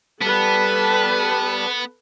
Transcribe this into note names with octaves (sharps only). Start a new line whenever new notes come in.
G3 B3 A4 B4 A5